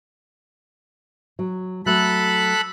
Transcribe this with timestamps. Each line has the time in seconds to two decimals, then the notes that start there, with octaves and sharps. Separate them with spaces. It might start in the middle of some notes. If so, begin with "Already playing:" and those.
1.39 F#3
1.86 F#3 A3 A4 B5 F#6